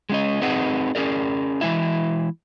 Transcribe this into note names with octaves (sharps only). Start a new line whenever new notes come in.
G#3 C#4 D#5
C4 D#4 G#4 B4 D#5 F#5
C#4 G#4 A#4 D5
E3 G#3 E4 E5